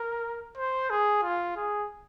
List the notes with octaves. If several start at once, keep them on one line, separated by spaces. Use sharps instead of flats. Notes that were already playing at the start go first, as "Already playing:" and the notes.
Already playing: A#4
C5
G#4
F4
G#4